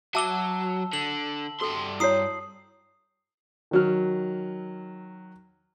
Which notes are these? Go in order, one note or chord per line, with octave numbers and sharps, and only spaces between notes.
F#3 E5 A5 D6 E6 G7
D3 F#7
G2 F#4 A4 C6
E4 F#4 C#5 D#6 C7
D#3 F#3 F6